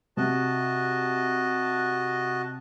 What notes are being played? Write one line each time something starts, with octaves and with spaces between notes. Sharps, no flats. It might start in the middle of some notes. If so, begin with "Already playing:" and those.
C3 F#4 D#5 A5